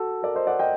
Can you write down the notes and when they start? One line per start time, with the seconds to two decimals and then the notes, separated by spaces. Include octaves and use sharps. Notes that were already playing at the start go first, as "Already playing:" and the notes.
Already playing: F#4 A4
0.23 A#4 D5
0.35 C5 D#5
0.47 D5 F#5
0.59 D#5 G5